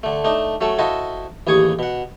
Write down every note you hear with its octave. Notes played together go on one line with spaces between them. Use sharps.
D3 A3
A3 D4 D#4
F#3 A3 C#4 A4
E4 F#4 A4 C5 D#5 F5
A1 D#2 G#4 G#5 C#6 D#6
B2 F#5